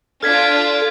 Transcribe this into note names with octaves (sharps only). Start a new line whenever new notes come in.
D4 F4 A4 F6 G#6 B6